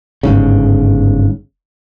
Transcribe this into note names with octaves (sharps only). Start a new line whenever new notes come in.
G1 G#2 C#3